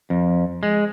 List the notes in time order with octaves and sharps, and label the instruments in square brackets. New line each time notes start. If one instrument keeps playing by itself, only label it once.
[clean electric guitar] F2
G#3